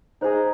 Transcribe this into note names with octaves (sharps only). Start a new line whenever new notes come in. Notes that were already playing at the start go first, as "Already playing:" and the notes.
D#4 G#4 C5 D#5